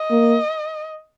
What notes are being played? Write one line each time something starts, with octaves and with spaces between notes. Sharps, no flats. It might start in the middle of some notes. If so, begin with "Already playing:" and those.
Already playing: D#5
A#3